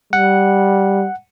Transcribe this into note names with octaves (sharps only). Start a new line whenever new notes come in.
G3 F#5